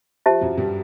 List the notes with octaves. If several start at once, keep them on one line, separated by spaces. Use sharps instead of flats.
F3 G4 C5 E5 A5
F#2 F#3
G2 G3